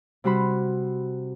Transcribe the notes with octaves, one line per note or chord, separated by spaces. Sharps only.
C3 G3 F#4 C5 B5